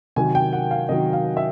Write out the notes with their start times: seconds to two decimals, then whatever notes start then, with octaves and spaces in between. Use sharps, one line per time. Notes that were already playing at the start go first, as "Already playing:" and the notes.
0.16 C3 D#3 F#3 G#5
0.35 G5
0.53 F#5
0.71 F5
0.89 C3 D#3 F#3 D#5
1.13 F5
1.37 E5